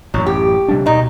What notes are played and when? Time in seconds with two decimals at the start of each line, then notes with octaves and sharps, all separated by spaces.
0.14 A1 F#2 F#3
0.26 G4
0.68 C3 G3 D4
0.86 D2 B2 D#3 D#4